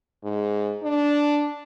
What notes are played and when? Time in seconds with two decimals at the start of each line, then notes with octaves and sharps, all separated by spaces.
0.24 G#2
0.83 D4